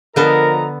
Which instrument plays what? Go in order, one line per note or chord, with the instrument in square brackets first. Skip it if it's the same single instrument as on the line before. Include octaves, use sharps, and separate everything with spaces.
[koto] D3 B3 A4 [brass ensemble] F3 D#5 A#5 [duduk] A#4